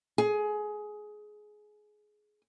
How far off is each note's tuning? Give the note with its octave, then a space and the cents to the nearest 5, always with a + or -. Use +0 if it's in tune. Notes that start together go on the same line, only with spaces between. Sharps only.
G#4 +20